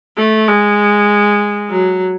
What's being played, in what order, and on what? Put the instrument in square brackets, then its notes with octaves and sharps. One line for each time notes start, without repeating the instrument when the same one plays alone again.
[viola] A3
G#3
F#3